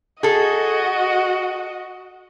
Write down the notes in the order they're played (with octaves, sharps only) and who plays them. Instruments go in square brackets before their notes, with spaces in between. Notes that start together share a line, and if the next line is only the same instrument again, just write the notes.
[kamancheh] F#4 D#5 [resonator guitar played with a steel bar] G#4 A4